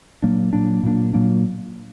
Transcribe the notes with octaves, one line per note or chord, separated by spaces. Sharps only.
A#2 F#3 A#3 D4
A#2 F#3 A#3 D4
A#2 F#3 A#3 D4
A#2 F#3 A#3 D4